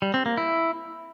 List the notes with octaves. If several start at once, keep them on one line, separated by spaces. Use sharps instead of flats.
G3
C4
A#3
E4